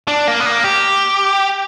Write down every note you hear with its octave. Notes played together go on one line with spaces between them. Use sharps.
D4
A#3
B3
A#3
G4